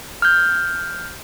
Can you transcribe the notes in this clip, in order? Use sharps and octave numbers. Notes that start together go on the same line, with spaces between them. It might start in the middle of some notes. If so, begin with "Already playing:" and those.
F6 G6